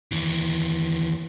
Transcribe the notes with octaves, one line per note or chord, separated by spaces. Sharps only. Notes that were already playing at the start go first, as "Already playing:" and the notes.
D#2 E3